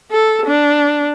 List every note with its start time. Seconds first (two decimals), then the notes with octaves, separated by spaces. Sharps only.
0.11 A4
0.46 D4